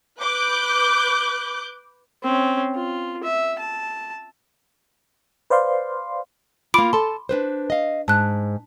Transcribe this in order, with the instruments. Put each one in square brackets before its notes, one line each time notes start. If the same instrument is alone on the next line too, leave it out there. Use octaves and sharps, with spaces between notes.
[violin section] B4 D6 F#6 G6
[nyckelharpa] C4 C#4
F4
E5
A5
[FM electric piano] B4 C5 D5 F5 C6
[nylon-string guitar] A#3 F4 [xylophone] B5 D6 D7
[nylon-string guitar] A4 A5 [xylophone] C6
[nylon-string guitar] D4 B4 C5
D#5 F5
[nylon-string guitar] G#2 [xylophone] A5 F#6